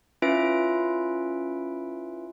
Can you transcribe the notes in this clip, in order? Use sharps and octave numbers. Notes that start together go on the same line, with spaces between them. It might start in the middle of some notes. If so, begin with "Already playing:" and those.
C#4 E4 F4 B4 E5 D7